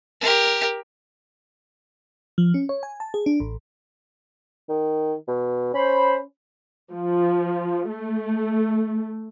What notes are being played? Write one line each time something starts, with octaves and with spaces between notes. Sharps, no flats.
G4 A#4
F3
C#4
C#5
G#5
A5
G#4
D4
A1
D#3
B2
C#4 C5 B5
F3
A3